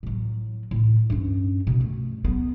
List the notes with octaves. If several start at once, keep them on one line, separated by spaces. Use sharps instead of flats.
A2 F#3
A2
G2 C#4
B2
A3
F#3 B3